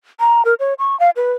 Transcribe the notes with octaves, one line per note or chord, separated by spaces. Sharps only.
A#5
A#4
C#5
C#6
F5
B4